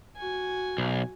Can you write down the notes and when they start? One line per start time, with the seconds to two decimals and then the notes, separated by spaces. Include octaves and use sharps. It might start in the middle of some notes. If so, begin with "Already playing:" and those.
0.17 F#4 G#5
0.78 B1